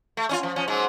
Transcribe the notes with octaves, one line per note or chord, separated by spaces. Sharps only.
A3
C#4 D#4 F4
F3
F3 C#4
G#2 F#3